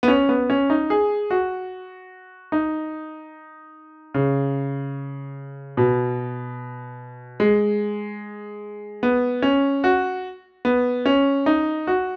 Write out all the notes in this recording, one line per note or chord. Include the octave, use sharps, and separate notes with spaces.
B3
C#4
B3
C#4
D#4
G#4
F#4
D#4
C#3
B2
G#3
B3
C#4
F#4
B3
C#4
D#4
F#4